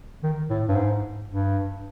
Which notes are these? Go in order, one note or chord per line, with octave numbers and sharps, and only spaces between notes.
D#3
A2
G2
G#2
G2